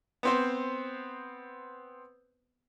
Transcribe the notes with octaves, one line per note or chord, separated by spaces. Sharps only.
B3 C4 C5